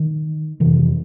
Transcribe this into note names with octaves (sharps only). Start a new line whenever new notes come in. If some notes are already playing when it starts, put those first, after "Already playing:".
Already playing: D#3
F2 C3 E3